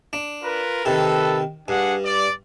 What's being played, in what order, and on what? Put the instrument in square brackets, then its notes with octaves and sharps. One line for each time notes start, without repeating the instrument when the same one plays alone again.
[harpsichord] D4
[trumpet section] F4 A#4 B4
[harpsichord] C3 D#3 [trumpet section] A4 B4
[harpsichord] G2 [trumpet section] D4 G#4 F#5
[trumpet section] D5